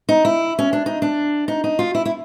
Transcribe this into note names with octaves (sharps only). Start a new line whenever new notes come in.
D#4
E4
C#4
D4
D#4
D4
D#4
D#4
F4
E4
E4